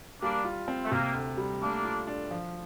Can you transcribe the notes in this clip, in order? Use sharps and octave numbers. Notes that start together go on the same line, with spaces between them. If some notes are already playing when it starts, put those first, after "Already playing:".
G3 A#3 D4
F4
C4
A3
C3 A#3
D2
G3
A3 A#3 D4
F4
D4
F3